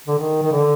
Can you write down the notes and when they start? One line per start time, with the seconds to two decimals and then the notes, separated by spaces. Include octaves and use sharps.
0.07 D3
0.18 D#3
0.42 D#3
0.52 D3